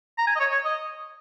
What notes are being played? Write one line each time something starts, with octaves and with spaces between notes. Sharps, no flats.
A#5
G#5
D#5
C#5
C#5
D#5